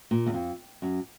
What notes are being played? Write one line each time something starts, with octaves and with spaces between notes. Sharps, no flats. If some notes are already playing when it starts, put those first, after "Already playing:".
A#2
E2
F2
F#2